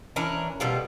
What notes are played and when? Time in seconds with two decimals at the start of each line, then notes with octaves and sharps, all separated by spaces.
0.16 E3 C#4 D4 A#4
0.60 B2 G3 F4 A4